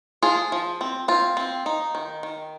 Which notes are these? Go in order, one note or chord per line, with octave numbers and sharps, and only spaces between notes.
F3 F4 G#4
F3
C4
C4 F4
C4
D#4
D#3
D#3